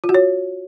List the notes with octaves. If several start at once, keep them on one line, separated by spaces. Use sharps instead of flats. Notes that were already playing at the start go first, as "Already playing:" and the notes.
F4
F#4
C#5